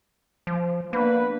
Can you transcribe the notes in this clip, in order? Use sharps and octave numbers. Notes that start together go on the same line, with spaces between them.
F3
A#3 B3 D4 B4